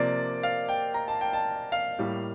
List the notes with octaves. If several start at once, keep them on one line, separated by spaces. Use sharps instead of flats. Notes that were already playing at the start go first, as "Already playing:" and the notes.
Already playing: C3 F3 A#3 D5
F5
G5
A#5
A5
G5
A5
F5
A2 G3 A#3